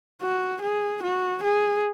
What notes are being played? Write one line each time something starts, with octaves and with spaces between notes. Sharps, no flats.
F#4
G#4
F#4
G#4